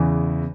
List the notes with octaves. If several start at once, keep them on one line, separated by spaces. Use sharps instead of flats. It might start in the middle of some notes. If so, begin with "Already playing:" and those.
Already playing: E2 C#3 E3